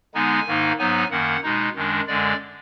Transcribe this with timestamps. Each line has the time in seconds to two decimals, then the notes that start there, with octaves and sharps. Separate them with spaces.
0.14 D3 G#3 B3 D#4 G#5
0.47 G#2 D#3 A#3 D#4
0.79 G#2 F#3 B3 D#4 G#5
1.11 F#2 D#3 A#3 F#5
1.43 B2 G#3 D#4
1.75 F#2 D#3 G#3 D4
2.07 F#2 D3 G#3 D5